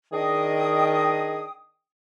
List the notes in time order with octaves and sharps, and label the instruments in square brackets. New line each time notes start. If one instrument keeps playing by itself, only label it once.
[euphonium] D#3 [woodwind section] D4 G#4 D#5 [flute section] G5 D#6